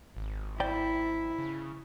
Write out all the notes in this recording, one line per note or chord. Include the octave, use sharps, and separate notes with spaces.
G#1
E4 C5 D5 G5
C#3